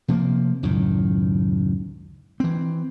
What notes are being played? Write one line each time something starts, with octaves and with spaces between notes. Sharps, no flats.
C3 F3 G3 A#3
C#2 F#2 A2 D#3
E3 C4